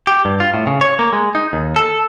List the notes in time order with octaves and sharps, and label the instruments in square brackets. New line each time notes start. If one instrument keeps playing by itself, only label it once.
[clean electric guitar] G4
G2
F4
A2
C#3
C#5
A#3
G#3
D#4
D#2
A4